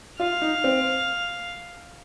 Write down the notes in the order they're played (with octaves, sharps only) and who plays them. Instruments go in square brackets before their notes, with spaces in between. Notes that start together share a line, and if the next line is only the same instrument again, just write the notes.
[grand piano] F4 [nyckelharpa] F5
[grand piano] D#4
C4